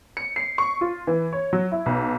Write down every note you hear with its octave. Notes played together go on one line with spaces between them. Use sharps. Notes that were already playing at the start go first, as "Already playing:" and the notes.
C#7
C7
C#6
F4
E3
C#5
F#3
E4
B1